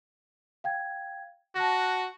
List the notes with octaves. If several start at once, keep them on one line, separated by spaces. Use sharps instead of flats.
F5 G5 G#6
F#4 A5 F#6 A#6